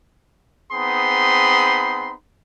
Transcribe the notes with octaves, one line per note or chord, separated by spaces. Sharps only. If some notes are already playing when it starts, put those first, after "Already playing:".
B3 C4 D#4 G#4 B5 C6